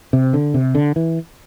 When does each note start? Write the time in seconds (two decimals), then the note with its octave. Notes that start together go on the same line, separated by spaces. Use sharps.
0.13 C3
0.34 D3
0.54 C3
0.75 D3
0.96 E3